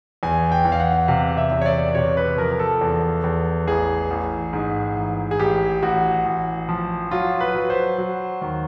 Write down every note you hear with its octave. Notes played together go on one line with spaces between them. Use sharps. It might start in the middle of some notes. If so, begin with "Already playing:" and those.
E2 G#5
G5
E2
F5
F#5
C3 F5
E5
E2
C#5
D5
C3 C#5
B4
F3 A#4
A4
E2
E2
A1 G#4
A1
G#2
A1
G#4
A1 G4
A1 F#4
A1
F3
F#3 F4
B4
F#3
C5
F#3
D#2